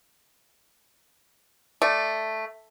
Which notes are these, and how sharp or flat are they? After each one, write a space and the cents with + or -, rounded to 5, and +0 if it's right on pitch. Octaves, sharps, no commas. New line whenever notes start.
A3 +0 D5 +10